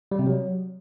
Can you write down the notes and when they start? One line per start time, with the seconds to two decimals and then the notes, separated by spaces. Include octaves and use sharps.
0.12 G3
0.19 C3
0.26 F#3